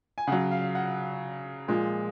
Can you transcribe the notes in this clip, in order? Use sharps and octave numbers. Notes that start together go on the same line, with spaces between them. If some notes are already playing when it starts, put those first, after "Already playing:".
G#5
C#3 F#3 F#5
F5
F#5
A#2 F3 G#3